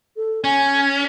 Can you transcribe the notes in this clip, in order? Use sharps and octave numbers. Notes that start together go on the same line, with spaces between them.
A4
C#4 G#5